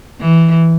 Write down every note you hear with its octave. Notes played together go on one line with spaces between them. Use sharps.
E3